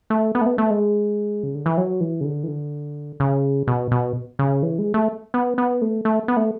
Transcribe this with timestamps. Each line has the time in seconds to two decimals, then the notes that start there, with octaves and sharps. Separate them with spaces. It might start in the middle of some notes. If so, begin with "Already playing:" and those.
0.10 A3
0.35 B3
0.41 A3
0.46 B3
0.58 A3
0.70 G#3
1.43 C#3
1.55 D3
1.66 E3
1.78 F#3
2.01 E3
2.21 C#3
2.24 D3
2.44 E3
2.48 D3
3.20 C#3
3.67 B2
3.91 B2
4.39 C#3
4.63 E3
4.79 G#3
4.94 A3
5.34 B3
5.58 B3
5.82 A3
6.05 A3
6.28 B3
6.37 A3